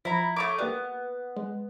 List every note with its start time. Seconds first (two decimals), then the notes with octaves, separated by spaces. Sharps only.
0.05 F3 E4 A#5
0.36 A3 C#5 D6
0.58 A#3 B3 G4 D5
1.37 G#3